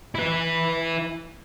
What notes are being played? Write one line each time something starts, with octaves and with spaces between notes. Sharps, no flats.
E4 B4